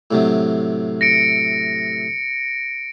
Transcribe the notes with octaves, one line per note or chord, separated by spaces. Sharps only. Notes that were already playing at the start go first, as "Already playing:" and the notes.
A2 C3 F#3
A#6 C#7 D7